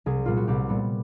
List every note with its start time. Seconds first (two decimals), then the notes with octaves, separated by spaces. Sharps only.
0.06 C2 G#4
0.26 A#2 G3 B3 F4
0.37 F#4
0.48 C2 G4
0.69 A#2 G3 B3